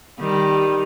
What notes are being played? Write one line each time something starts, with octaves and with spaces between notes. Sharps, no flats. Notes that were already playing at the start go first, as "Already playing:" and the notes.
D#3 G3